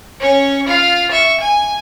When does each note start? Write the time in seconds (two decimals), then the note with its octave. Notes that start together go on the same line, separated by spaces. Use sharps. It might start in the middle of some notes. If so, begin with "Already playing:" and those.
0.20 C#4 C#5
0.67 F4 F5
1.11 E5 C#6
1.41 G#5